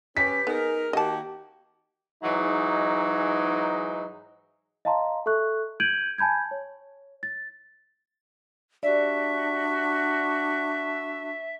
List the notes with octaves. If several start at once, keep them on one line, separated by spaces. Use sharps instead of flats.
C#4 G4 B4 B6
B3 D#4 G#4 A#4
D#3 A#3 F#4 G4 D#5 A5
G#2 E3 F#3 D#4
D#5 F5 A5 A#5 C6
A4 E5 C#6 F#6
G6 G#6 D7 D#7 F#7
G#5 A5 B5 G6 G#6
C#5
A6
D4 F#4 G4 D5 E5